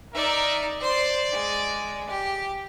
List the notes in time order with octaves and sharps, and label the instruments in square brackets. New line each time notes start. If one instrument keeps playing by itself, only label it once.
[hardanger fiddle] D#4 D5 [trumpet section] A#4 E5
[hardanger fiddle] C5 C6 [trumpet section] D5
[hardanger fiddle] G#3
G4